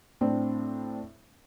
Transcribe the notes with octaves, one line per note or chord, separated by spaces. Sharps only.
A2 C4 D4